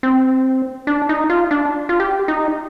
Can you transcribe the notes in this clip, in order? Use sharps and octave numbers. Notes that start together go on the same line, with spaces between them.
C4
D4
D#4
F4
D4
F4
G4
D#4